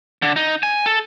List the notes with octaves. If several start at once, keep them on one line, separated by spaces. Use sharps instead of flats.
D3
D#4
G#5
A4